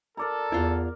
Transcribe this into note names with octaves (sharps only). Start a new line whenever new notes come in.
A4 A#4 D5 A#5
E2 E4 F4 F#5